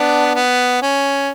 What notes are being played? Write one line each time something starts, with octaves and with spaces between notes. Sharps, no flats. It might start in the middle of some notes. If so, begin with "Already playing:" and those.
Already playing: B3 D4
B3
C#4